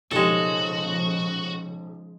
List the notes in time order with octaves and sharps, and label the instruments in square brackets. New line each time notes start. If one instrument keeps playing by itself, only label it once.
[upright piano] B1 G4 [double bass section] A#2 C#3 F3 [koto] G#3 A4 [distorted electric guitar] F#4